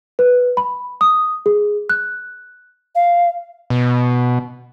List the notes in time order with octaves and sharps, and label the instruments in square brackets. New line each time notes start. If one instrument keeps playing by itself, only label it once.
[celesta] B4
B5
D#6
G#4
F#6
[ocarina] F5
[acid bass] B2